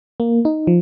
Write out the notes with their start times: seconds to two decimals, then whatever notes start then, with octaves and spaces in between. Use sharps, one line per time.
0.20 A#3
0.45 D#4
0.67 F3